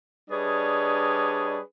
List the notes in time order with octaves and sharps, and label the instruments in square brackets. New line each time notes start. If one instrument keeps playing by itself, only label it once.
[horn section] G3 D4 G#4 B4 C#5 D#5